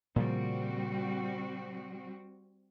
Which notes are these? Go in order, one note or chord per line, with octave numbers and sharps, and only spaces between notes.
A#2 C#3 F3 G3 C4 F#4